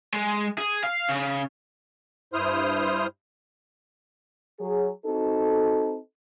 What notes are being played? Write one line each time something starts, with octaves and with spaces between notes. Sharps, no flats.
G#3
G#4
F5
C#3
G2 E4 C5 C6 D#6 F6
F#3 G#4
C4 D#4 F#4 A4